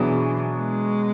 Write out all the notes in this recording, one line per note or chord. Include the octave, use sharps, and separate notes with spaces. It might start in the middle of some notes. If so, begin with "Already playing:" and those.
Already playing: B2 E3 F#3 B3 D4 G#4
G#3